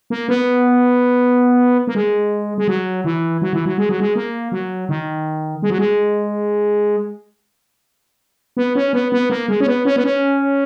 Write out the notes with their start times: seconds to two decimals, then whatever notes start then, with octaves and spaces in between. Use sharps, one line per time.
0.10 A#3
0.29 B3
1.87 A#3
1.95 G#3
2.58 G#3
2.68 F#3
3.04 E3
3.42 F#3
3.53 E3
3.65 F#3
3.78 G#3
3.89 F#3
4.00 G#3
4.16 A#3
4.52 F#3
4.89 D#3
5.62 G#3
5.70 F#3
5.78 G#3
8.57 B3
8.75 C#4
8.93 B3
9.12 B3
9.30 A#3
9.48 G#3
9.60 C#4
9.67 B3
9.85 C#4
9.96 B3
10.04 C#4